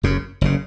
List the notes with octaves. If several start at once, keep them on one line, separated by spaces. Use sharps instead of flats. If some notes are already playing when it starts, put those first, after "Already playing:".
F#1 F#2 C#3
F#1 C#3